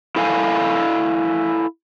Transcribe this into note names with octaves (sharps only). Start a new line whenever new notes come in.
E4 A4 F5 G#5